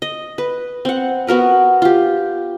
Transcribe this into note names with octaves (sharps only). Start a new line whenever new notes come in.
D#5
B4
C4 F#5
B3 F#4 A#4 B4
F4 G4